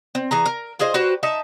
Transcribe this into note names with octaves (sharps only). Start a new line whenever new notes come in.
C4
E3 G#4 A#5
A#4
F4 G#4 C5 D#5
F#4 G4 B4 C5
D#4 E5 A5